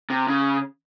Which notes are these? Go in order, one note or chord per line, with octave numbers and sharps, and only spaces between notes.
C3
C#3